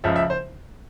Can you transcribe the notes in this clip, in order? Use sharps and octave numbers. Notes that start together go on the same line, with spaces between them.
C#2 C#3 F3 E5
E5
C5